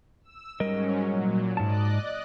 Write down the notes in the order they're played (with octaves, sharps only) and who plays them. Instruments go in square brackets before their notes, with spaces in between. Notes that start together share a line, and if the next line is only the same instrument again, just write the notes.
[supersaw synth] E6
[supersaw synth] G#2 F#3 C#4 [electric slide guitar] G3 A#4 D#5
[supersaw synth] A#2 F#3
[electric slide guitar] G#2 A5 [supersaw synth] D5 D#5 F#6